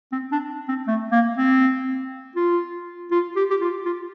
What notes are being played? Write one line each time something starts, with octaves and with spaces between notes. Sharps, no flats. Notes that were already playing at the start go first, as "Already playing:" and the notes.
C4
D4
C4
A3
A#3
C4
F4
F4
G4
G4
F4
F4